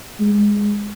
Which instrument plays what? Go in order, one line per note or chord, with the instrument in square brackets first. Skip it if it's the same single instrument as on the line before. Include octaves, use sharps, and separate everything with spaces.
[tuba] G#3